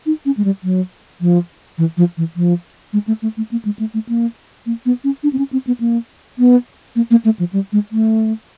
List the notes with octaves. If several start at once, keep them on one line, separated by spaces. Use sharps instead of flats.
D#4
C#4
G#3
G3
F#3
F3
E3
F3
E3
F3
G#3
A3
A3
A3
A#3
G#3
A3
A3
A#3
A#3
B3
C#4
D4
C4
C#4
C4
B3
A#3
B3
A#3
A#3
A3
F3
G3
G#3
A3